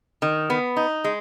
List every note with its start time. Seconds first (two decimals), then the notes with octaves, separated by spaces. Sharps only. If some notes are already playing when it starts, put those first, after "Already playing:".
0.22 D#3
0.50 B3
0.77 D#4
1.04 G#3